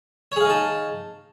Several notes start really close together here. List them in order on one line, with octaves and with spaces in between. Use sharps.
C#5 G#4 F5 D#4 A5